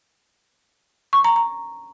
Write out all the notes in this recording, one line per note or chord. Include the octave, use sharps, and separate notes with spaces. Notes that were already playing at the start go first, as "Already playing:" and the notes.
C#6
A#5
A#5